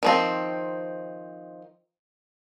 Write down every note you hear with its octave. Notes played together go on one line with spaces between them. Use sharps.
D#3 F3 C4